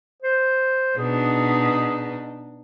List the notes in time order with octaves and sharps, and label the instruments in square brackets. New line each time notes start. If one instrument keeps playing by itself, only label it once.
[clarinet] C5
[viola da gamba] B2 D4 D#4 [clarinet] G#4